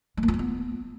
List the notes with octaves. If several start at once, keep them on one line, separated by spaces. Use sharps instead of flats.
G#3
A#3
F4
A3
B3